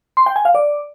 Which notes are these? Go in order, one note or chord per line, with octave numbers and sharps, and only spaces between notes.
C6
G5
G#5
F5
D5